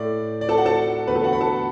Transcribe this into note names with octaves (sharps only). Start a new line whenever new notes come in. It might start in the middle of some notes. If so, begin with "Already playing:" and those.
Already playing: A2 A3 D5
D5
A4 A5
F#4 F#5
A4 A5
E2 D3 A3 B4 B5
A4 A5
F#4 F#5
B4 B5
A4 A5